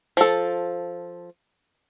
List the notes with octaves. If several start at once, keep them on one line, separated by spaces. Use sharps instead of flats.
F3 A4